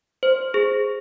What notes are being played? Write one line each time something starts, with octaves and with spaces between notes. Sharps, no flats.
C5
G#4